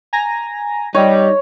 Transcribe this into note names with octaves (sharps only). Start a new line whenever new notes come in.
G#5 A#5 A#6
G3 D#4 C#5